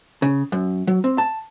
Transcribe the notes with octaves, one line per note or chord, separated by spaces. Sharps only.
C#3
F#2
F#3
C4
A5